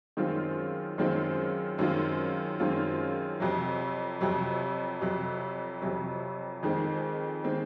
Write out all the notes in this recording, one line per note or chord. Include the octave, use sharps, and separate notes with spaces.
F#2 D#3 G#3 C4 F4
F#2 D#3 G#3 C4 F4
F#2 D#3 G#3 C4 F4
F#2 D#3 G#3 C4 F4
F2 C3 F#3
F2 C3 F#3
F2 C3 F#3
F2 C3 F#3
F2 D#3 G#3 C4
D#3 G#3 C4